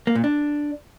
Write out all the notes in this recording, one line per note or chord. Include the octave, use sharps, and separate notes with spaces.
A#3
A#2
D4